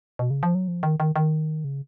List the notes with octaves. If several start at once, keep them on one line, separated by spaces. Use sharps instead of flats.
B2
C#3
F3
F#3
F3
D#3
D#3
D#3
C#3